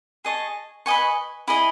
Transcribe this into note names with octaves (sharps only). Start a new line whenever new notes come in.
G#4 D#5 A5 C#6
B4 D#5 G#5 C#6
E4 G#4 D#5